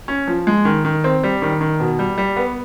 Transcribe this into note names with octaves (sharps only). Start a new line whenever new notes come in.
C#4
F3
G#3
D#3
D#3
C4
G3
D#3
D#3
B2
G3
G3
B3